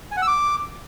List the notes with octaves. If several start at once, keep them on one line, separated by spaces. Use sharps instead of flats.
G#5
F#5
E6
D6